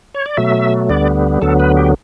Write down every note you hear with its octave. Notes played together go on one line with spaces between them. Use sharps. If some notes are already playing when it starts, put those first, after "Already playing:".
C#5
D5
B2 F#3 A3 E5
D2 D3 G3 B3 D5
D2 D3 F#3 B3 A4
B4
G4